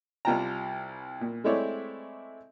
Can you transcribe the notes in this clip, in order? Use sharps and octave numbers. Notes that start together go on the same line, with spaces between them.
C2 G3 F4 G5 A5 A#5
A#2
G#3 A3 C4 E4 C#5 D5